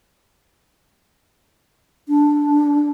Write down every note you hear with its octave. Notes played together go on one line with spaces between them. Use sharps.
D4